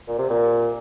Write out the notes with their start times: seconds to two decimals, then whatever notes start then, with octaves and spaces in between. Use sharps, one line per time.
0.08 A#2
0.18 C3
0.30 A#2